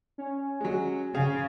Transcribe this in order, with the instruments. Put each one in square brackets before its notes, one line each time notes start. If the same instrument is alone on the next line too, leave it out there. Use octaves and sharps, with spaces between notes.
[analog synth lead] C#4
[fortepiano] F#3 G#3
[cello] C#3 [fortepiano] G#4 F5